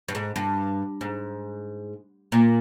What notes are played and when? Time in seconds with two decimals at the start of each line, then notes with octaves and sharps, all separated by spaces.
0.08 G2
0.15 G#2
0.36 G2
1.01 G#2
2.32 A#2